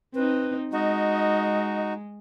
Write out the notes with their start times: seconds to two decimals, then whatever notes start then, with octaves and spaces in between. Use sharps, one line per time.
0.15 C4 D#4 B4
0.73 G#3 D#4 F#4 D#5